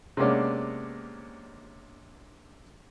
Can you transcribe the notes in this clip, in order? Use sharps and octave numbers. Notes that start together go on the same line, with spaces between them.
C3 G#3 A#3 B3 C#4 D4